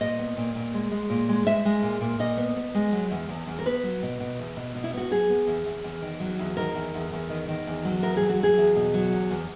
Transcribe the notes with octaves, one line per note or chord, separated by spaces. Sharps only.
A#2 D#5
B3
A#2
A#2
G#3
G#3
A#2
G#3
G#3 E5
G#3
A#2
A#2
A#2 D#5
B3
B3
G#3
F#3
E2
E2
E2
A#4
B3 B4
F#3
B2
B2
E2
B2
B2
E4
B3 F#4
F#3 G#4
B3
E2
E2
E2
D#3
F#3
E2
D#3 A#4
E2
E2
E2
D#3
D#3
E2
F#3
E2 A#4
F#3 G#4
F#4
F#3 G#4
E2
B2
F#3
E2
E2